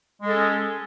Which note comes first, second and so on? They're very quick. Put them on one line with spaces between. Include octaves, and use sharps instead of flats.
G#3 A4 G#4 C#4